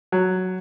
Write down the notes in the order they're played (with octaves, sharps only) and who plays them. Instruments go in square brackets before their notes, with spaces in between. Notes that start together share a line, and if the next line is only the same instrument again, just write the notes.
[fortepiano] F#3